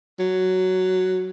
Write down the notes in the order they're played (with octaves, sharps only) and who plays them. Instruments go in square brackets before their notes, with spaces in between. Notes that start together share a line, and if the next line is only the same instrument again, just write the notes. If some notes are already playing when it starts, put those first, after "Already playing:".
[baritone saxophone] F#3